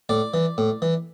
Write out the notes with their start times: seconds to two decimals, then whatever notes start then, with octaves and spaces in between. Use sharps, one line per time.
0.09 A2 D5
0.34 E3
0.58 A2
0.82 E3